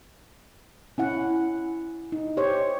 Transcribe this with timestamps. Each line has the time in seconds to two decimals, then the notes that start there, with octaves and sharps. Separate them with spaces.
0.98 C#4 E4 F#5
2.12 D#4
2.37 G4 C5 C#5